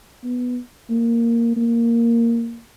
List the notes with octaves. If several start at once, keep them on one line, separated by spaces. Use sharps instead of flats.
B3
A#3
A#3